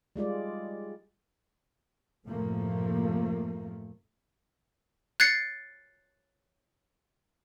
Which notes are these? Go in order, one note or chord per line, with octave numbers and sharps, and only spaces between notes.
G3 G#3 F4 D5
F#2 A2 C3 F3 A3 A#3
F#6 G#6 A6 C7 C#7